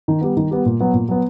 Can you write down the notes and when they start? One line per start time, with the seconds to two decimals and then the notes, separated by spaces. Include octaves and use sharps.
0.08 D#3
0.21 G3 B3
0.37 D#3
0.51 G3 B3
0.66 A#2
0.80 F#3 B3
0.94 A#2
1.09 F#3 B3